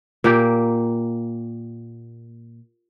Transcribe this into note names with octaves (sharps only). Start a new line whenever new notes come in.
A#2 A#3 G4